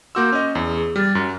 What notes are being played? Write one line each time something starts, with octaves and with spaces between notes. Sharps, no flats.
A#3 F#4 C6 D6 E6 G6
C#4 D#5
E2 G#4
G#4
G3 F6 A6
F#2